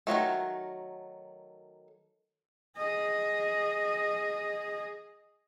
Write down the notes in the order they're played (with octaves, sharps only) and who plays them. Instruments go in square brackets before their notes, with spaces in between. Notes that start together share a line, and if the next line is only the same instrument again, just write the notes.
[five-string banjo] D#3 F3 F#3 A3
[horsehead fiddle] G#4 D#5